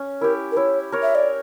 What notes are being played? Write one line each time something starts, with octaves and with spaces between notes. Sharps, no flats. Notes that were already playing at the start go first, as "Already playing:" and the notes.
Already playing: C#4
E4 G4 A#4
A#4
E4 C#5
A#4 C#5
E5
D5